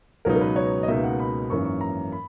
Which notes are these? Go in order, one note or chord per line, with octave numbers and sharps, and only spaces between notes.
C#2 B2 F#3 B3 D#4 A#4
A#4
B4
C#5
D#5
C#2 B2 A#3 D#4 E5
F#5
B5
G#1 F#2 E3 A#3 C#4 C#6
C#6
A#5
B5